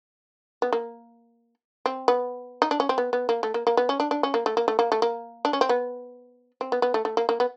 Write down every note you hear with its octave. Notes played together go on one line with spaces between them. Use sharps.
B3
A#3
C4
B3
D#4
D4
C#4
C4
B3
B3
A#3
A3
A#3
A#3
B3
C#4
D4
D4
C#4
A#3
A3
A#3
A3
A#3
A3
A#3
D4
C#4
C4
B3
C4
B3
B3
A3
A3
A#3
A#3
B3